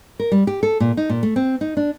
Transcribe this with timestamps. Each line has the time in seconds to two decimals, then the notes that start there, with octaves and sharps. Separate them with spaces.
0.20 A#4
0.32 G3
0.47 G4
0.63 A4
0.80 A#2
0.97 D#4
1.09 A#2
1.23 A3
1.36 C4
1.61 D#4
1.77 D4